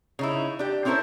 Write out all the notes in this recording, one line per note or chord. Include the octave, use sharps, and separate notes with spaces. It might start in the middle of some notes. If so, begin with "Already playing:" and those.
C#3 D#4 E4
D4 G4
C4 C#4 E4 A4 A#4 C5